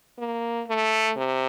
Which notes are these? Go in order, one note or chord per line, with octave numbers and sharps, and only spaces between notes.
A#3
A3
C3